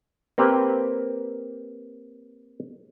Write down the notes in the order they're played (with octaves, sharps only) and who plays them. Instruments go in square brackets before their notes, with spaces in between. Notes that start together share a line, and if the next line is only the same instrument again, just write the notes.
[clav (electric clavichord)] A#3 C4 G4 B4 C5